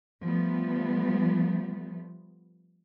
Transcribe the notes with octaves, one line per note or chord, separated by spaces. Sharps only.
F3 G3 A3 B3